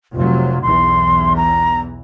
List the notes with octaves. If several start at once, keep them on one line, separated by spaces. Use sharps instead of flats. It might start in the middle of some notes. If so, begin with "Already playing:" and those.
F1 C3 F#3 F4
B1 E2 E3 C6
A#5